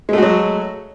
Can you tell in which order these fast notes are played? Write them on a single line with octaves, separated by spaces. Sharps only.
G#3 A3 F#4 F#3